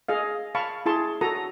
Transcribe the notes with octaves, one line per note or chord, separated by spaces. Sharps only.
G#4 D#5 F5
F5 A5 B5 C#6
E4 G#4 A5 C6 C#6
F#4 A4 A#5 D#6